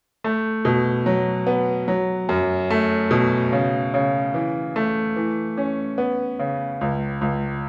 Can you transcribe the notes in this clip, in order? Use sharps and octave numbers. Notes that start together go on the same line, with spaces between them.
A3
B2
F#3
B3
F#3
F#2
A3
B2
C#3
C#3
E3
A3
E3
C#4
B3
C#3
C#2
C#2